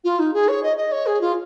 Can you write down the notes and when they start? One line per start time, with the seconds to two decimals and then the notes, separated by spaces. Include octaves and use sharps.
0.04 F4
0.19 D#4
0.33 G#4
0.48 C#5
0.63 D#5
0.77 D#5
0.91 C#5
1.06 G#4
1.21 F4